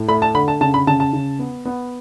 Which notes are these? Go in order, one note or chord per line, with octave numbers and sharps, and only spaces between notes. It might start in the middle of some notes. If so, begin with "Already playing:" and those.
Already playing: A2
A3 B5
A5
D3 B5
A5
C#3 A5
B5
C#3 A5
A5
C#3
B3
B3